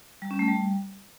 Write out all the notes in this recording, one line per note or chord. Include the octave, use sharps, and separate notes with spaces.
G3
C#4
A3
G3